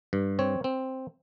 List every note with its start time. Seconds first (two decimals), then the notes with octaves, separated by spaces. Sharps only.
0.13 G2
0.39 C4 C#5
0.64 C4